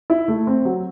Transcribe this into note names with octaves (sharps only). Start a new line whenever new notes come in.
E4
A3
C4
F#3